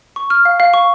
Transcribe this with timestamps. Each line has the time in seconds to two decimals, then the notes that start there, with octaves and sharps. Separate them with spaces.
0.16 C#6
0.30 F6
0.45 F5
0.60 F5
0.74 C#6